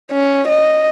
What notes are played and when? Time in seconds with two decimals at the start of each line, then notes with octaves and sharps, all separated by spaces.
0.12 C#4
0.49 D#5